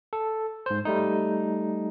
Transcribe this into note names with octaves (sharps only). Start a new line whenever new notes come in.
A4
G#2 C5
G3 A3 D#4